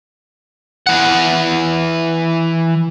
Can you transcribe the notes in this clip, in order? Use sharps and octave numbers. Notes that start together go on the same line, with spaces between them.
E3 F#5